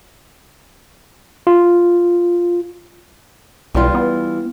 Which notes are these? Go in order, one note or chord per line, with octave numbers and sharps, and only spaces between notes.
F4
B1 E3 G3 F4
B3